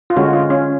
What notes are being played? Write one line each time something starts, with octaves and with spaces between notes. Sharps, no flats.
F4
D3 G#3 C#4 F#4
F4
C#4